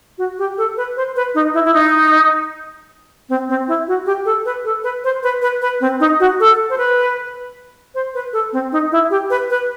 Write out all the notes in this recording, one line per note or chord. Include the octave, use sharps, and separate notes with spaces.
F#4
G4
A4
B4
C5
B4
D#4
E4
E4
D#4
C4
C4
E4
F#4
G4
A4
B4
A4
B4
C5
B4
B4
B4
C4
D#4
F#4
A4
C5
B4
C5
B4
A4
C4
D#4
E4
G4
B4
B4